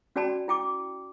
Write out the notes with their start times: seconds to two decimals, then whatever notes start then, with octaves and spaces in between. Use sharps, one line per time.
0.16 C#4 F#4 D5 G5 A5 B5
0.48 E4 G5 D6